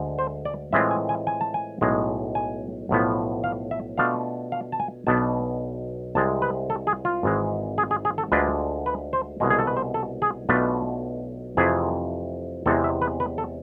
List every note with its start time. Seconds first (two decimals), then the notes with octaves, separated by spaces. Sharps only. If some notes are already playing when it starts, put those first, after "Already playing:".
Already playing: D2 D3 G#3
0.19 C5
0.45 D5
0.73 A2 E3 G#3 C4 F4 E5
0.91 G#5
1.09 G#5
1.27 G#5
1.41 A5
1.54 G#5
1.81 B1 A2 G#3
2.35 G#5
2.89 B1 A2 F3 B3
3.44 F5
3.71 E5
3.98 B2 A3 D4 F4 F5
4.52 F5
4.72 A5
4.80 G#5
5.07 B1 B2 B3 D4 A5
6.15 C2 C3 G#3 A5
6.42 B4
6.70 A4
6.87 G#4
7.05 F4
7.23 G#1 G#2 E3 G#3
7.78 G#4
7.91 G#4
8.05 G#4
8.18 A4
8.32 D2 D3 G#3 D4 F4 B4
8.86 B4
9.13 C5
9.40 C2 B2 G#3
9.50 G#4
9.59 A4
9.67 B4
9.77 C5
9.94 A4
10.22 G#4
10.49 B1 B2 A3 D4 F4 B4
11.57 F2 C3 E3 A3 E4 G#4
12.66 E2 C3 E3 G#3 A4
12.84 E5
13.02 B4
13.20 B4
13.38 A4